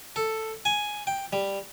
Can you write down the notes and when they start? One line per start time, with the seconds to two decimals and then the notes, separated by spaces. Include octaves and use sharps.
0.16 A4
0.65 G#5
1.07 G5
1.33 G3